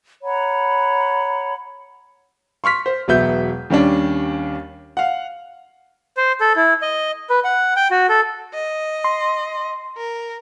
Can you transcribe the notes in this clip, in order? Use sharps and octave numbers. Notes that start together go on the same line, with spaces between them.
C#5 F#5 A#5 B5
C6 C#6 F6 B6
C5
E1 F#3 B3 E5 G6
D#2 G3 C#4 D4
F5 F#5
C5
A4
E4
D#5
B4
F#5
G5
F#4
A4
D#5
C6
A#4